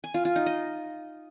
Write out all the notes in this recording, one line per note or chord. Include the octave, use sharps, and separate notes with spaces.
G#5
F4
F4
D#4
D#5